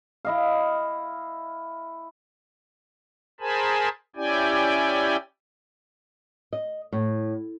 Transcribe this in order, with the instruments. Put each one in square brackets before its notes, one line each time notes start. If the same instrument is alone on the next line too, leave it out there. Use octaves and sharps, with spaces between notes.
[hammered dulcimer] E4 D#5 F5
[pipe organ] G#4 A#4 C5 G#5 A5 B5
C#4 E4 G4 D5 G5 G#5
[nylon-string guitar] D#5
A2